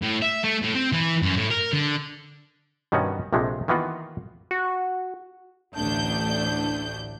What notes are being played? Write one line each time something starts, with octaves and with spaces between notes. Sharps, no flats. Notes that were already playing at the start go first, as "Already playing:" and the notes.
A2
E5
A3
A2
C4
E3
F#2
A2
A#4
D3
G2 B2 D#3 B3 C#4 F#4
A#1 C3 F3 G#3 A3
D#3 E3 A#3 B3 F4 F#4
F#4
A1 D2 D4 G6